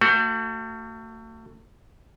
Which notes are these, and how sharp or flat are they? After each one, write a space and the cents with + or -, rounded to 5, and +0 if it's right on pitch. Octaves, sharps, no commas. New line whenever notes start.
A3 +35 F#4 +0